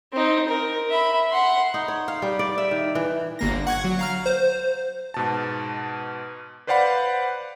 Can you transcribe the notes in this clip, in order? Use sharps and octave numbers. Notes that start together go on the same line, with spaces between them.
C4 D#4
A#4
E5 B5
F#5 C6
D#4
C#5
F5
G3
D5
E5
D#3
E3
G1 A#3 A#6
D3
F#5 C#6 G#6
F#3
F5 A#5 F6
C5
G#2 B2 A5
B4 C5 D5 F5 F#5 B5